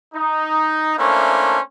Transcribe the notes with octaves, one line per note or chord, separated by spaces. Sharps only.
D#4
A3 A#3 C#4 D4 E4 C5